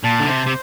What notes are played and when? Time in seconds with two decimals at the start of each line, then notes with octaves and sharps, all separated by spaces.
0.04 A#2 A5
0.20 D3
0.28 C3 C5
0.47 C3